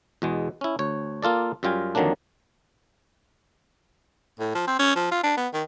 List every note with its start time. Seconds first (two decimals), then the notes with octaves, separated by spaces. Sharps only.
0.22 E2 B2 G#3
0.61 C#4 E4
0.79 D2 C#5
1.22 A#3 F4 A4 D5
1.63 F#2 G3 F4 G5 G#5
1.95 F2 D3 D#3 F#3 A#3 D4
4.40 A2
4.55 F3
4.68 C4
4.79 C#4
4.96 F3
5.11 F4
5.24 D4
5.37 B3
5.54 D#3